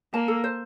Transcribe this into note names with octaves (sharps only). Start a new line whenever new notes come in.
A#3 A5
A4
C5